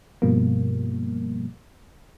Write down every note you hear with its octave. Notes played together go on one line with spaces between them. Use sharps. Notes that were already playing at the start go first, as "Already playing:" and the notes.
G2 B2 F3 G3 A#3